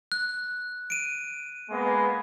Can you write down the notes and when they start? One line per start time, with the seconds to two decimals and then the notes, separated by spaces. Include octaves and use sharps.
0.12 F#6
0.90 D7 D#7
1.71 G#3 A#3 B3